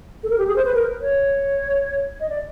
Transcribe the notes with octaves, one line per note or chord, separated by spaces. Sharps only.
A4
A#4
G4
G#4
C5
B4
A#4
C#5
D#5
D5